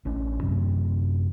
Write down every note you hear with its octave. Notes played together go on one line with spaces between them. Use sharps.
A1 C#4 D4
F#2 C3